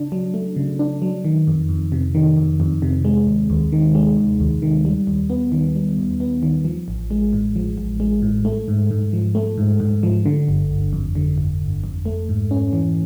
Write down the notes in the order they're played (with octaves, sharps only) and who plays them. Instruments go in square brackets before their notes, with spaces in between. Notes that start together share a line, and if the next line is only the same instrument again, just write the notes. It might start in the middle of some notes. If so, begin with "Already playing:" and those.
Already playing: [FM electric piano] C#3 D4
F#3
A3
C#3
D4
F#3
D#3
F2
F2
C3
D#3
F2
F2
C3
G#3
D#2
D#2
D#3
G#3
D#2
D#2
D#3
G3
D#2
B3
D#3
G3
D#2
B3
D#3
F3
A1
G#3
A2
F3
A1
G#3
A2
A3
G#2
G#2
F3
A3
G#2
G#2
F3
D3
G1
G1
F2
D3
G1
G1
F2
A3
G#2
C#4
E3